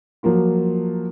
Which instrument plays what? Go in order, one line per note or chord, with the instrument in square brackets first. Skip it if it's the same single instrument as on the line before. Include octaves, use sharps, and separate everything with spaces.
[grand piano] F3 F#3 A#3 F4